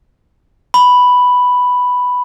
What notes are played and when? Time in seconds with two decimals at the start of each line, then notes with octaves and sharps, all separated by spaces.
0.74 B5